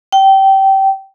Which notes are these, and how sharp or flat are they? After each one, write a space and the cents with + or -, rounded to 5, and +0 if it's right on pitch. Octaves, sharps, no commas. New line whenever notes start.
G5 -20